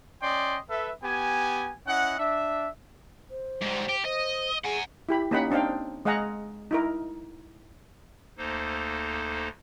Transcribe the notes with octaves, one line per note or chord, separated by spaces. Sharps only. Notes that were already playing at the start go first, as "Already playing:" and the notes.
C#4 D5 D#5 G5 C6
A4 B4 E5
B3 G4 G#5
C#4 E4 D#5 F#5
D4 E5
C5
G#2 G3
G4
C5 D#5
G#4 F#5 G#5
E4 G4 B5
A#3 C#4 D#4 G4 F#5 B5
C4 D4 D#4 F5 G5
G#3 D#5 F5 F#5 G#5 A#5
D#4 E4 A#4
D2 A#3 D#4 A4 C5